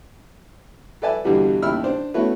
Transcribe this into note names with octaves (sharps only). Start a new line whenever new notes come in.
A4 B4 D5 E5 G#5 A5
E2 G2 B2 D3 G3 B3
A1 D#2 E4 B5 E6 F6
D4 C5
A3 B3 C#4 E4 F#4 B4